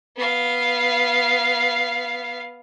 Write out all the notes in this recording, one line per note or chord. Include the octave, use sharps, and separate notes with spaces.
B3 F5